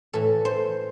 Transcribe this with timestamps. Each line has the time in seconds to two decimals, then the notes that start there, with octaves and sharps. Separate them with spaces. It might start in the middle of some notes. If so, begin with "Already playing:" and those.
0.13 A2 E3 A4
0.45 C5